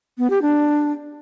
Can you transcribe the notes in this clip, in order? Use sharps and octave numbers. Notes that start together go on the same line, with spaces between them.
B3
G4
D4